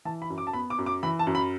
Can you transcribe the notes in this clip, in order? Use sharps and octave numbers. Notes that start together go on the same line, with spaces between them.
E3 A5
B5
F#2
D6
A5
B3 B5
D6
F#2
D6
E3 B5
A5
F#2
B5